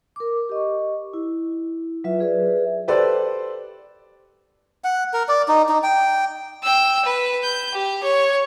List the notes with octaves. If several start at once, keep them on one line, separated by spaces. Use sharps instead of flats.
A#4 D6
G4 D#5 C#6
E4
F#3 F4 B4 E5
G#4 B4 D5 E5
G4 A4 B4 C5 D5
F#5
A#4
D5
D#4
D#4
G5
G5 E6
B4
G6
G4
C#5